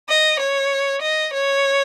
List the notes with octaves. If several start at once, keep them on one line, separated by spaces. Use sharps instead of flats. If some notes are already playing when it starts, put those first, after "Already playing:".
D#5
C#5
D#5
C#5